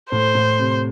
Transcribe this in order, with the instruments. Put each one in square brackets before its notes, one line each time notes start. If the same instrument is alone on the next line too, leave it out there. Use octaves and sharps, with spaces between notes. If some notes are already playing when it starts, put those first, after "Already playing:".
[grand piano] A2 [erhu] C5
[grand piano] A2
C3